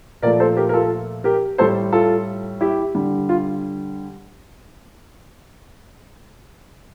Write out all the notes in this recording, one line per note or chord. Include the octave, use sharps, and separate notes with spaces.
A#2 F3 A3 A#4 D5
A4 C5
G4 A#4
A#4
F4 A4
G4 A#4
A2 G3 A4 C5
F4 A4
E4 G4
D3 G3
F4